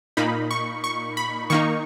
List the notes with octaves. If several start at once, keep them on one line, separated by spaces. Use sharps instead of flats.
A#2 A#3 D#4 B5
C#6
C#6
B5
D#3 A#3 D#4 C#6